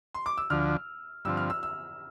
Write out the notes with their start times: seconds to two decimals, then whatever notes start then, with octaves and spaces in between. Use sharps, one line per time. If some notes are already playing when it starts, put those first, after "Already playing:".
0.14 C6
0.26 D6
0.38 E6
0.50 D2 D3 F3 F6
1.25 G2 D3 F3 C4 E6
1.37 F6
1.50 E6
1.63 E6